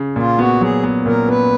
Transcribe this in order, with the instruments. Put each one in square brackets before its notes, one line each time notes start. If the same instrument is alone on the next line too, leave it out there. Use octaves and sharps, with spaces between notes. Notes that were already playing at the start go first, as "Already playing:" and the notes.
Already playing: [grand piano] C#3
[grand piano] A#2 [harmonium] F4
[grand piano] B3 [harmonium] F#4
[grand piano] F#3 [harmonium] G#4
[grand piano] B3
[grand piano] A#2 [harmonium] A#4
[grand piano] B3 [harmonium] B4